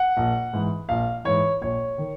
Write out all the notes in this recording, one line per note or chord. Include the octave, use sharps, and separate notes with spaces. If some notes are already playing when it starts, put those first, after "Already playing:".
Already playing: F#5
A#1
G#2 E3
A#1 F5
G#2 E3 C#5
A#1 C#5
D#3